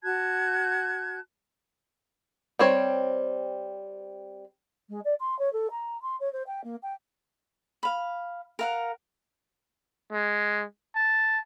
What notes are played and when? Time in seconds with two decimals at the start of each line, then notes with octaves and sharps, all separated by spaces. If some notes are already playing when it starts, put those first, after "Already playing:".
0.03 F#4 A5 F#6 G#6
2.59 G3 C4 C#5
4.89 G#3
5.04 D5
5.19 C6
5.38 C#5
5.52 A4
5.70 A#5
6.02 C6
6.20 C#5
6.32 C5
6.46 G5
6.63 A#3
6.82 G5
7.83 F5 B5
8.59 A#4 F5 F#5
10.12 G#3
10.96 A5